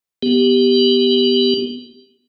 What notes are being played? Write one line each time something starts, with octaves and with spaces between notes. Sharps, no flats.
B3 G4